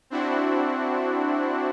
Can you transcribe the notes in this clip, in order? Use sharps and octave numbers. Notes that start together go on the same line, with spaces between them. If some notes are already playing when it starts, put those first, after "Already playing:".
C4 D4 E4 F#4